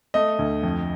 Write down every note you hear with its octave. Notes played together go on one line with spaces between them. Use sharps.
A3 D#5
D2
F2